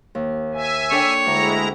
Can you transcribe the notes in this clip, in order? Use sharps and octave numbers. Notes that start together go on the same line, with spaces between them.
D#2
E5 G#5
D4 A4 C#5 G5
D2 G#3 E4 A#5